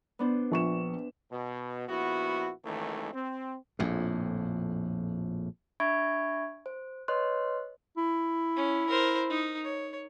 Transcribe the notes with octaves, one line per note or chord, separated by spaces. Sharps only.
B3 D4 C5
A#1 C#6 E7
B2
A#1 B3 E4 F#4
G#1 C#2 D#3 E3 A3
C4
A#1 F2 A2
D4 E5 B5 C#6 G#6 D7
C5
B4 C#5 D#5 C6 F#6
E4
C#4
A#4 C5
D#4
C#5